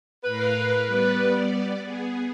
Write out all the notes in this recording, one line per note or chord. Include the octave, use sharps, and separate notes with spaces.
A2 A#4 B4 F5
G3 B3 D5
B3 G#4